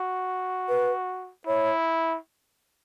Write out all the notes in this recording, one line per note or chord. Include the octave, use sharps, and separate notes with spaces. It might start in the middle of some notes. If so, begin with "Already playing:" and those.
Already playing: F#4
B4
E4 C#5